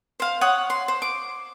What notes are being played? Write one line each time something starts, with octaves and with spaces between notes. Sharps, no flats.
C5 F5
C#5 F#5 D#6
C6
C5
D6